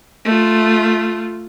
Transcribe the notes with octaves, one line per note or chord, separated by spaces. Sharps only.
A3 F4